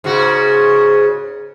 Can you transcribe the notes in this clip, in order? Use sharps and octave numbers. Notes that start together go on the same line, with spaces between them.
G#2 C#3 F#4